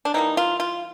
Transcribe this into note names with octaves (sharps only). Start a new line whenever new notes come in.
D4
E3 G3 A#3 D#4
F4
F4